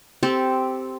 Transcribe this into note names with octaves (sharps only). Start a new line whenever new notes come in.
C4 G4 A4